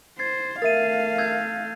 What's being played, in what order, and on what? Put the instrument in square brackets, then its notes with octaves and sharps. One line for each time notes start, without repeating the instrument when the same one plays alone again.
[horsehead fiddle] C5 [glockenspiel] G#6 A6 C7
[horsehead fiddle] A3 F5 [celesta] A#4 E5 [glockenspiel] A6 D#7
[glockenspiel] E6 G6 G#6